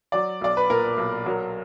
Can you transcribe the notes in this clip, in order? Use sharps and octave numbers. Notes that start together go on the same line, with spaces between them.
F#3 D5
B1 D5
B4
A#2 A#4
B1
F#3 A#4